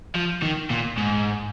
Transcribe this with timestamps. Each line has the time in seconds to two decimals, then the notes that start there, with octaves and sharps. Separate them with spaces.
0.16 F3
0.43 D#3
0.70 A#2
0.97 G#2